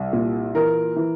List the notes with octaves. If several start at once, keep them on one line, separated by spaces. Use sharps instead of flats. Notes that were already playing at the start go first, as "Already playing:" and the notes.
Already playing: C2
A#2
E3 A#4
E3